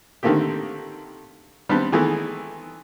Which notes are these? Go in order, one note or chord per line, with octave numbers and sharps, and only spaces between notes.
D3 D#3 A3 A#3 C4 G4
G3 B3 C4 D4
D#3 E3 G#3 A3 B3